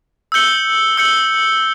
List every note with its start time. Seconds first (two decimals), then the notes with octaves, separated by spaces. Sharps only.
0.32 E6 G6 C#7 G7
0.98 E6 G6 C#7 G7